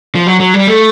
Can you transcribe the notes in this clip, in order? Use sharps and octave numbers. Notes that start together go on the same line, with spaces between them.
F3
F#3
F#3
G3
A3